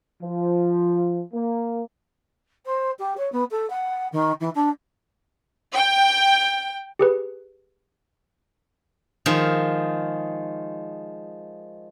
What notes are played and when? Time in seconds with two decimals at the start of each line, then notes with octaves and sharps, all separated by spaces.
0.22 F3
1.33 A#3
2.66 C5
2.99 G4
3.17 C#5
3.32 B3
3.51 A4
3.70 F#5
4.12 D#3
4.40 E3
4.55 D4
5.76 G5
6.99 G4 G#4 B4
9.26 D#3 F3 G#3